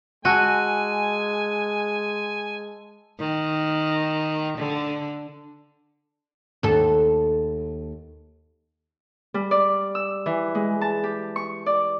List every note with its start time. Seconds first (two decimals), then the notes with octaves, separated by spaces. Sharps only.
0.25 G#3 F#4 G#5 A5 E6 D#7
3.19 D#3
4.57 D3
6.63 D#2 A4
9.34 G3
9.51 D5
9.95 E6
10.26 E3
10.55 G#3
10.81 A5
11.04 G4
11.36 C#6
11.66 D5